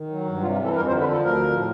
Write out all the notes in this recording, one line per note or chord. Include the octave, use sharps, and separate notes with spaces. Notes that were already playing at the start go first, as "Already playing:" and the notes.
Already playing: D#3
F#3
G2
C3 F4
F4
E3
A4
F2 A#4
D3 C5
B4
F3
A4
D2 A#4
F3
A2